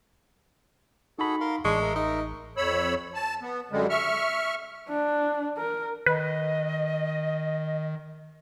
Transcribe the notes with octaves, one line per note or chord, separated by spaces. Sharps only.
D#4 F#4 G#4 A4 B5
A#4 F5 C6
A1 G#3 D4 C#6
A#4 E5
D#4
F2 C#5 B5 E6
A5
B3
F#2 D3 G3 G#3
E5 C#6 F6
D4
A#4
D#3 B4 D#5